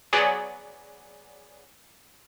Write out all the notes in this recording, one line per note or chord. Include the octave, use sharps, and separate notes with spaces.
F#3 B3 G#4 D5